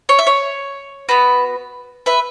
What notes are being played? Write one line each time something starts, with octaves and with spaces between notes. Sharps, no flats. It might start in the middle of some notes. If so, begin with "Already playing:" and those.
C#5
E5
C#5
B3 F#4 B4
B4 E5